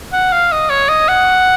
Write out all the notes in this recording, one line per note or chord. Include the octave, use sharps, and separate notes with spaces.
F#5
F5
D#5
C#5
D#5
F#5